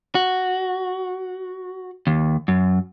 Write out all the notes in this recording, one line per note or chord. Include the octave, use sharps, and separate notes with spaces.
F#4
D#2
F#2